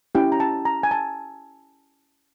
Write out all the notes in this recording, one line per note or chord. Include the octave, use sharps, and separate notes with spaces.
C#4 E4 G4 G5
A#5
A5
A#5
G#5
A5